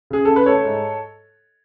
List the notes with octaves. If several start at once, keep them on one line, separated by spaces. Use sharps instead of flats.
C#3 G#4
C#3 A4
B4
A3 A4 C#5
G#2